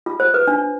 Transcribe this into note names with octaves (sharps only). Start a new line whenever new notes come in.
F4
C5
B4
D4